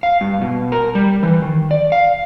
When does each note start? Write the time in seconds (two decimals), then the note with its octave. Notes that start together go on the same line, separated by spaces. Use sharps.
0.03 F5
0.21 G2
0.41 B2
0.72 A#4
0.95 G3
1.23 E3
1.42 D#3
1.71 D5
1.92 F5